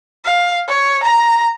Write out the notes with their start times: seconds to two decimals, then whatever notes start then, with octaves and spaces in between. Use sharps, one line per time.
0.25 F5
0.68 C#5
1.03 A#5